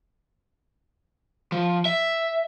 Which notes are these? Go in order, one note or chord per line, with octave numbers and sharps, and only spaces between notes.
F3
E5